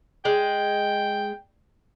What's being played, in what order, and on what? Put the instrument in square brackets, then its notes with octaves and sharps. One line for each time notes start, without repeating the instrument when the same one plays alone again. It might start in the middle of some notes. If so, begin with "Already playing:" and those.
[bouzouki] G#3 [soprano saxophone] G5